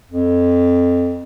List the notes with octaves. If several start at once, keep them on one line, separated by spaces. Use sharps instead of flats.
F2